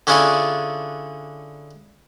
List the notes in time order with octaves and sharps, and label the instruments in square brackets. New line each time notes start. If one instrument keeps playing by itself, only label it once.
[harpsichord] D3 C#4 D4 E4 F4 G#4